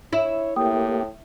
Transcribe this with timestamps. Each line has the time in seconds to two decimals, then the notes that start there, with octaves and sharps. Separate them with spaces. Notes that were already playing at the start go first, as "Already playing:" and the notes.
0.13 E4 C#5
0.56 A2 A#3 G4 G5 D#6